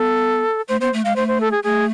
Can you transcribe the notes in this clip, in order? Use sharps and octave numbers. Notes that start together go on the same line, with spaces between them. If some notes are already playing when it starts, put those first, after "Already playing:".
Already playing: B3 A4
A3 C5
B3 C5
A3
G#3 F5
A3 C5
C5
A4
G#4
A3 G#4